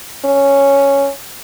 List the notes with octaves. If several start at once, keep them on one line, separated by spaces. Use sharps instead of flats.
C#4